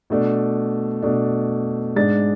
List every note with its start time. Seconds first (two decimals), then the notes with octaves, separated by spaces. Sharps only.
0.10 B2 A3 D4
1.03 B2 A3 D4
1.96 G#2 G#3 D4 A6